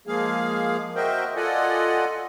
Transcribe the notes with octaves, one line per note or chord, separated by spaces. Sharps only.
F3 G#3 A#3 G#4 F5
F#4 A#4 C5 D#5 E5 G5
F4 A4 D5 D#5 F#5 G#5